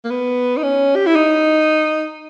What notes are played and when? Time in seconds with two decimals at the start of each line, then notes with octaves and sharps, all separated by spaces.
0.04 A#3
0.10 B3
0.57 D#4
0.63 C#4
0.96 G4
1.06 E4
1.16 D#4